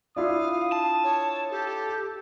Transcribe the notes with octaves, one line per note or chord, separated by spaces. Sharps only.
D4 E4 F4 F5 D#6
A5
C#5
G4 A4